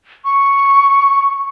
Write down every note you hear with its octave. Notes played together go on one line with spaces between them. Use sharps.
C#6